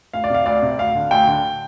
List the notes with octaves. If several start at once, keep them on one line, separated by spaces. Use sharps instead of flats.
D2 F5
D5
C3 F5
D2 D5
C3
D2 F5
D3
D2 G5
D3